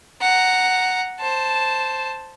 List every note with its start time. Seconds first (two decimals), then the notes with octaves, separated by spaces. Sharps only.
0.21 F#5 A#5
1.20 C5 A5